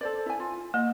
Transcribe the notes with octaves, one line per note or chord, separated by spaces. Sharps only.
A4 C5 D5
E4 G#5
F4
A#3 D#5